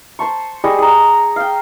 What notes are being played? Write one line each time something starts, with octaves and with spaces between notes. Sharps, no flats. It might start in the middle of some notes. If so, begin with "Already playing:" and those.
C5 A5 C#6
G3 G#4 D#5 C#6
G#4 A#5
F5 G5